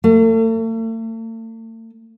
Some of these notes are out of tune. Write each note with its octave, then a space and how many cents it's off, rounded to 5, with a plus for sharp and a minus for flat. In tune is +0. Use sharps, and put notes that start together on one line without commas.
A3 +40